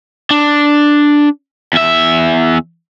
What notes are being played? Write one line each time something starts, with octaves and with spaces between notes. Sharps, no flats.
D4
E2 E5